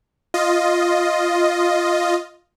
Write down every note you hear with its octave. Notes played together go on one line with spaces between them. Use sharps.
F4 D#5